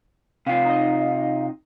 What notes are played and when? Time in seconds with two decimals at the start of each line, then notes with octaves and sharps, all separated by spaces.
0.47 C3 F4 F5
0.65 D#4 D#5